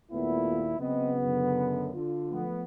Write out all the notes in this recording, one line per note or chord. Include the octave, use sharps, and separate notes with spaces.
D#2 A#2 A3 B3 E4 F4
C#3 F#3 B3 C4 D#5
F#2 D3
D3 F4
F3 A3 B3